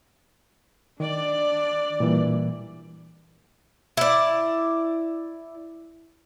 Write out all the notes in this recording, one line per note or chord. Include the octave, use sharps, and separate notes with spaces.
D#3 D4 D5
A#2 E3 G3
E4 D5